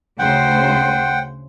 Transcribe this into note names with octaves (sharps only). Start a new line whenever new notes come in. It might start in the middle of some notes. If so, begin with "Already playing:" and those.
D2 C#3 C5 F#5 G5